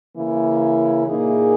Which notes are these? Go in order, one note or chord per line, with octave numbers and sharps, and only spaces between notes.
C#3 E3 A#3 E4
A#2 A#3 D#4 G#4